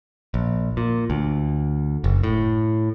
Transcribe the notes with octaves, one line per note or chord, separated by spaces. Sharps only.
A#1
A#2
D2
F#1
A2